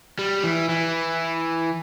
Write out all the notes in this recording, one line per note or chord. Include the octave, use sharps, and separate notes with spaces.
G3
E3
E3